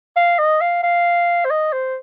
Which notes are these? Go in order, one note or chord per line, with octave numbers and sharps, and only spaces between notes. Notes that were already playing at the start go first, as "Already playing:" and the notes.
F5
D#5
F5
F5
C5
D#5
C5